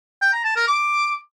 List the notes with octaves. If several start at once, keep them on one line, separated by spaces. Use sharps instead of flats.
G5
A#5
A5
A#4
D6